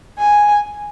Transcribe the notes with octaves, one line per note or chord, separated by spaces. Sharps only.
G#5